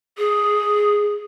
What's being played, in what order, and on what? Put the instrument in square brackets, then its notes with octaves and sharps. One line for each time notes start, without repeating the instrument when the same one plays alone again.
[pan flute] G#4